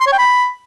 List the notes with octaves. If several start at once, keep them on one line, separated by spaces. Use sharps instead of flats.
C6
C#5
G5
B5